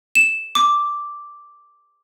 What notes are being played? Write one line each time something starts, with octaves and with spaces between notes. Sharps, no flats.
E7
D6